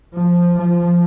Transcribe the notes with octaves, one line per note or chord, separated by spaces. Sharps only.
F3
F3